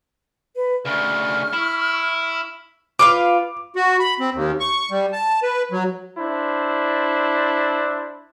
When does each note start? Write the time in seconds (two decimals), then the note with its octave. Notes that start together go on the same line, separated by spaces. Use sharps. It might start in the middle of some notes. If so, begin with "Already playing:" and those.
0.55 B4
0.85 D2 C#3 C#6 F6
1.54 E4
2.99 F4 B4 F5 D6
3.76 F#4
4.00 B5
4.20 C4
4.34 D#2
4.60 C#6
4.91 G3
5.13 A5
5.43 B4
5.72 F#3
6.18 D4 E4 C5